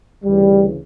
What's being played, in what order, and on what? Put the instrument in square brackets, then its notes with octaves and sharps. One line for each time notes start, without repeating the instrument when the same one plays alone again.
[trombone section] D2 C#3 E3 G3